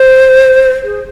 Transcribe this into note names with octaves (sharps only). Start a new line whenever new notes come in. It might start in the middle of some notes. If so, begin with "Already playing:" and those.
Already playing: C5
G#4